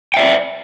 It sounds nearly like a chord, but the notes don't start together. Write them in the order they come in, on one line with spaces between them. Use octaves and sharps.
G5 E5 D5